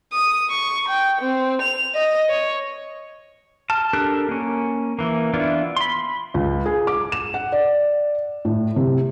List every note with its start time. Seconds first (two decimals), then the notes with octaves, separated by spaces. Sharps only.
0.13 D#6
0.50 C#6
0.88 G5
1.21 C4
1.62 F7
1.94 D#5
2.29 C#5
3.70 A5 F6
3.93 D4 G4 A4 A#4 F#6
4.29 A#3 C#4
4.99 E3 A#3
5.34 E3 B3 D4 E4 F4
5.77 B5 C6
6.34 C#2
6.66 G#4
6.87 D6
7.12 E7
7.34 F#5
7.52 D5
8.45 A2
8.76 C3